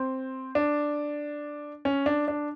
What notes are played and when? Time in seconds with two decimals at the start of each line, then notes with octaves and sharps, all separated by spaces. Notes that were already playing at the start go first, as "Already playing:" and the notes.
Already playing: C4
0.55 D4
1.85 C#4
2.06 D4
2.28 D4